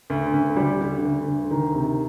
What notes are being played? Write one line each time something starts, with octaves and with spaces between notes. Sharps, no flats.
D2
D2
G3
D3
D2
D2
D#3
C3